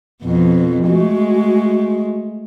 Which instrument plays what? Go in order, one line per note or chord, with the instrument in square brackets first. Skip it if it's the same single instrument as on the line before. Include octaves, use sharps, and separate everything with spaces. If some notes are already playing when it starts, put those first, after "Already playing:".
[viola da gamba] F2 B2 [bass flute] F3
[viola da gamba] G#3 A3 [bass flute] F#4